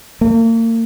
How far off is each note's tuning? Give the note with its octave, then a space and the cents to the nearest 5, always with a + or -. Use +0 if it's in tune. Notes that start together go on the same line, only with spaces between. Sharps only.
A#3 -40